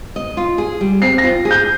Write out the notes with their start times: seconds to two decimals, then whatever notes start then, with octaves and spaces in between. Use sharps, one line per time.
0.16 D#5
0.37 F4
0.58 G#4
0.81 G3
1.02 C4 C7
1.18 A#6
1.24 F4
1.45 G#4
1.51 G6